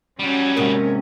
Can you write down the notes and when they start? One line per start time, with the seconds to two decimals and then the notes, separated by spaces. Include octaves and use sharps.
0.19 F#3 G3 C#4
0.56 D#2 G#2 C3 A#4